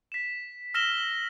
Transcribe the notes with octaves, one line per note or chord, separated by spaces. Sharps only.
B6 E7
E6 F6 A#6 B6 E7 G7